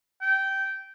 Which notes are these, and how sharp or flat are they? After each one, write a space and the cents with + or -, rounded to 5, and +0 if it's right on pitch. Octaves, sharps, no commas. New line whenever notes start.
G5 -15